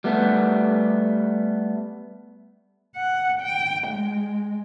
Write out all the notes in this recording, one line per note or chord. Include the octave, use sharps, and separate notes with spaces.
G3 A3 B3
F#5
G5
G#3